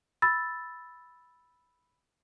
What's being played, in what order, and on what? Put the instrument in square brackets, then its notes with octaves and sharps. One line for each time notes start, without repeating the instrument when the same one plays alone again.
[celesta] B5 E6 A6